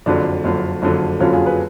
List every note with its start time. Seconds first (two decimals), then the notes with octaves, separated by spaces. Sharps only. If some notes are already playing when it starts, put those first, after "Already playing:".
0.06 F#1 F2 D3 F#3 D4
0.44 F#1 F2 D3 F#3
0.82 F#1 F2 D3 F#3
1.20 F#1 F2 D3 F#3 C#4 F4
1.33 F4 G#4
1.46 G#4 B4